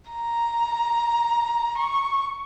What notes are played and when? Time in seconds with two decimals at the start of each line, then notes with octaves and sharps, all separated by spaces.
0.11 A#5
1.78 C#6